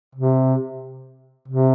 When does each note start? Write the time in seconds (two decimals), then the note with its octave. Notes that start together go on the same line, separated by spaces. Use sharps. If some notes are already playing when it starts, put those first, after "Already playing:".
0.15 C3
1.48 C3